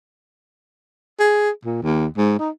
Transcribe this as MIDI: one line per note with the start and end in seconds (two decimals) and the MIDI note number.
1.20 1.50 68
1.65 1.78 46
1.83 2.07 39
2.17 2.38 44
2.39 2.50 63